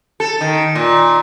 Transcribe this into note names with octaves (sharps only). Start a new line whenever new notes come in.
A4
D#3
A#2